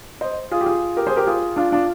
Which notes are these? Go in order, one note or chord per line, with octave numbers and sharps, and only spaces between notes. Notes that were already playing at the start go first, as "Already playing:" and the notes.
C5 D#5
F4 G#4
G4
F4 G#4
G4 A#4
G#4 C5
G4 A#4
F4 G#4
D4 F4
D4 F4